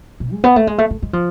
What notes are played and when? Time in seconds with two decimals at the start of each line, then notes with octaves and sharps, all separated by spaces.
0.20 B2
0.32 G#3
0.44 B3
0.56 A3
0.67 G#3
0.78 A3
0.90 A3
1.02 G#3
1.13 F3